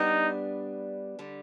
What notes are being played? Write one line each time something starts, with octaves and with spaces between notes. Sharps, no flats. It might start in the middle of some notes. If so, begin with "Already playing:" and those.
Already playing: G3 B3 D4 D#4
D3 G3